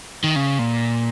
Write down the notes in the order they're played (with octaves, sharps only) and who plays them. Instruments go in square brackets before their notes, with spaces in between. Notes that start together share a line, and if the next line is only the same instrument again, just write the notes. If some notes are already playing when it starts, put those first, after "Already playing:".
[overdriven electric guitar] D#3
C#3
A#2